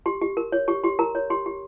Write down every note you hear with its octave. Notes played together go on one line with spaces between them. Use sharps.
G4 C6
G4
A#4
C#5
G4 C#6
G4 C6
A#4 A#5
C#5
G4 C6
G4